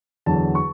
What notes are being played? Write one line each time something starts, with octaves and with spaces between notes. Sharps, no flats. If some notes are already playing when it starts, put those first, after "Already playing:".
E2 D3 F#3 A5
C#6